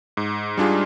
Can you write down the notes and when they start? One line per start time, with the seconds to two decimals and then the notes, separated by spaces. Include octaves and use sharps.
0.17 G#2
0.57 G3 D4 F4 G#4